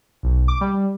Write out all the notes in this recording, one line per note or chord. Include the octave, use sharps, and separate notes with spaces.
B1
D6
G3